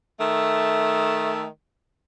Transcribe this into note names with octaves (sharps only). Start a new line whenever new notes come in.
D#3 A3